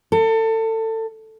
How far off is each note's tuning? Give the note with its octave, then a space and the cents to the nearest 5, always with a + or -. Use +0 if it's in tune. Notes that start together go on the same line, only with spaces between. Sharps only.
A4 +25